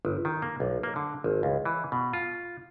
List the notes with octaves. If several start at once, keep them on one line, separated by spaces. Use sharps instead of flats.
G1
D#3
A#3
B1
A#3
D3
G#1
C#2
E3
B2
F4